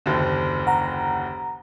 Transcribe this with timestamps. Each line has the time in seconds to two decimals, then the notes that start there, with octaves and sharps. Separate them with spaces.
0.06 F#1 D#2 D3
0.67 F#5 A#5